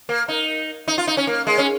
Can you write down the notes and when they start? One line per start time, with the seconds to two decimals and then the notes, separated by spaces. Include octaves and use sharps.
0.09 A#3
0.28 D#4
0.88 D#4
0.98 F4
1.07 D#4
1.17 C#4
1.27 A#3
1.47 G#3
1.58 C#4